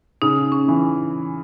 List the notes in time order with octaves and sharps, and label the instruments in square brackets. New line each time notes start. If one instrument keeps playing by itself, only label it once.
[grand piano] C#3 [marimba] D#4
[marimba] C#4
[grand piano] E3